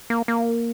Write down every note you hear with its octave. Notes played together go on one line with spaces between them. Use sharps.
A#3
A#3